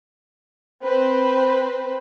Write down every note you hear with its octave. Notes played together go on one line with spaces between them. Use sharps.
C4 B4 C5